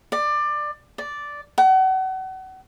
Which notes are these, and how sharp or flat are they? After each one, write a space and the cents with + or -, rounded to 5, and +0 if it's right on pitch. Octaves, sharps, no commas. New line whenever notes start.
D5 +20
D5 -5
F#5 +35